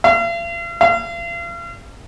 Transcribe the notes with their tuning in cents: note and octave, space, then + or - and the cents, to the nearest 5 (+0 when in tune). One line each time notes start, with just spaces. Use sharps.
F5 -45
F5 -40